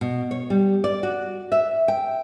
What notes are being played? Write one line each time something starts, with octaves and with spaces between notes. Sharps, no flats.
B2
C#5
G3
D5
F#4
E5
G5